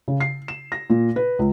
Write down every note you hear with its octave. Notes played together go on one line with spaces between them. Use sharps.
C#3
C7
E7
A#6
A#2
B4
C#2